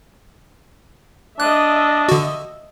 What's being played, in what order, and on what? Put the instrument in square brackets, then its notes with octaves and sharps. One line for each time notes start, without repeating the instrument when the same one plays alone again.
[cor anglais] D4 [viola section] D#5 E5 [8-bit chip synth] F#6
[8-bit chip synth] D3 F#4